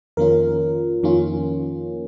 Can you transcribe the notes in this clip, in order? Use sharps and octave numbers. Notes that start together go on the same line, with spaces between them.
F2 D#3 A#3 C#4 F4 A#4
F2 D#3 A#3 C#4 F4